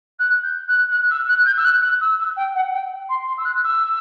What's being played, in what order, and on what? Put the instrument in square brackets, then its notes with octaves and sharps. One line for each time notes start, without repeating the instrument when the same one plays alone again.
[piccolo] F#6
G6
F#6
F#6
E6
F#6
G6
E6
F#6
F#6
E6
E6
G5
F#5
G5
C6
C6
E6
F#6
E6